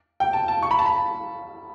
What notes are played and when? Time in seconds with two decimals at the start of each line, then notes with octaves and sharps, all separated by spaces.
0.20 G5
0.33 A5
0.48 A5
0.63 C#6
0.71 B5
0.79 A5
0.86 B5